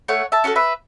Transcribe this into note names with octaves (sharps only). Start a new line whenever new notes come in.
A3 C#5 F#5
E5 A5
C#4 F#4 A4
B4 E5